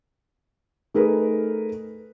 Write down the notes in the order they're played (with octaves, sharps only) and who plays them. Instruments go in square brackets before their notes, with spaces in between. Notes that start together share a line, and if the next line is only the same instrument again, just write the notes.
[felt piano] A3 D#4 G#4 A#4 B4